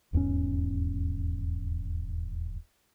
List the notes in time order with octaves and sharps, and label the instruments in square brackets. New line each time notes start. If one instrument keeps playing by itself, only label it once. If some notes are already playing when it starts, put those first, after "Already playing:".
[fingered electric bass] D#1 E2 G#2 C#4